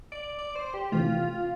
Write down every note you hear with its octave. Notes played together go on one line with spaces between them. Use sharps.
D5
D5
C5
G4
C3 E3 A3 F4